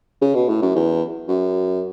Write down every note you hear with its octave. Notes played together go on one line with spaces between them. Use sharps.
C#3
B2
A2
F#2
E2
F#2